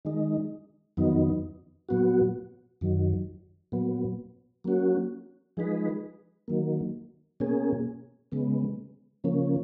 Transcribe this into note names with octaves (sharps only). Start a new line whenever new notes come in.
D#3 G#3 D#4
F2 D#3 F#3 B3 D#4
A#2 F#3 B3 F#4
F#2 D#3 F#3
A#2 F#3 B3
F#3 A#3 C#4 F#4
F3 G#3 D#4 G#4 B4
D#3 F#3 A#3
B2 A#3 C#4 G#4
C#3 G#3 B3
C#3 F3 A#3 C#4